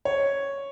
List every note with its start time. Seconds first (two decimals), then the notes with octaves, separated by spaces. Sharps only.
0.05 C#5